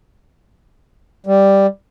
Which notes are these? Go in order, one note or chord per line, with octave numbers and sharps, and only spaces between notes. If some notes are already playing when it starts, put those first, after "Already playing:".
G3